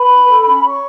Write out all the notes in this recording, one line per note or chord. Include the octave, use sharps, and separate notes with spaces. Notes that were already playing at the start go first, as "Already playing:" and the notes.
Already playing: B4 B5
D4
A4
C#4
C#5 C#6